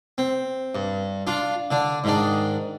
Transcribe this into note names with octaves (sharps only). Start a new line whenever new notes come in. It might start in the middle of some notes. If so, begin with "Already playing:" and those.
C4
G2
D4 F4
D3 D4
G#2 D#3 D4